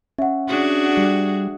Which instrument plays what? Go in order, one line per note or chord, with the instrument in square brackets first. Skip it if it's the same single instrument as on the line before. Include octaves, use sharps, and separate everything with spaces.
[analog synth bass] C#4 [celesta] E5 F#5
[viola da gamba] D4 F#4 G#4
[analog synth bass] G3